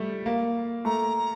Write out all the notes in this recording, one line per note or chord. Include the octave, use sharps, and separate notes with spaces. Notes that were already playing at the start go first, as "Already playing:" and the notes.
Already playing: G3 A3
A#3
A3 A#5